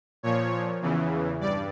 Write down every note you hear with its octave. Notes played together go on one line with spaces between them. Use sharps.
A#2 F3 C#5
E2 C#3 E3
G2 D5